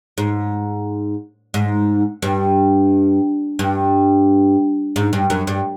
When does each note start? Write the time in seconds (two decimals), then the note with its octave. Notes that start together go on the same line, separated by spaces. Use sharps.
0.18 G#2
1.54 G#2
2.22 G2
3.59 G2
4.96 G#2
5.13 G2
5.30 F#2
5.47 G2